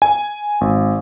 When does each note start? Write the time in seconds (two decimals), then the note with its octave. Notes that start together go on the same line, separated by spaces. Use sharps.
0.02 G#5
0.61 G#1